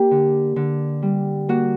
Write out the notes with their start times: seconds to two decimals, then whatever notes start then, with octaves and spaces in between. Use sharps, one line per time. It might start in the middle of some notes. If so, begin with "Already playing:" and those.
Already playing: A#3 G4
0.11 D3
0.56 D3
1.02 G3
1.48 A#3 F#4